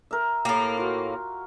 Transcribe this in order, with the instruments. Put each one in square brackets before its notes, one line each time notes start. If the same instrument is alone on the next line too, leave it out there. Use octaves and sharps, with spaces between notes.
[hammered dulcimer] A#4 E5
[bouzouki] A2 A#3 [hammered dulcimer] G4
[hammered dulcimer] F4 F#4